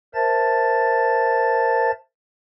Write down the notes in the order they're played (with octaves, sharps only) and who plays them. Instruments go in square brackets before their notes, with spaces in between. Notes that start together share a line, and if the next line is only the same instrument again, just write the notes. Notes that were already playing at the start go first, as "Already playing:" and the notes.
[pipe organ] A#4 C5 E5 A5 A6